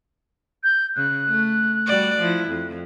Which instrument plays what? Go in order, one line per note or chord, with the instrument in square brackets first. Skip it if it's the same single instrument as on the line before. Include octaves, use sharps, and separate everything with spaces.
[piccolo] G6
[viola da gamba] C#3 [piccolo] F#6
[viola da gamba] A3
G3 F#4 D5
F3 E4
F2